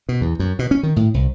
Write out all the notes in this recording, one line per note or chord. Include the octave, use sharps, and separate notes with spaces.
B2
E2
F#2
B2
C#4
D#3
A2
C2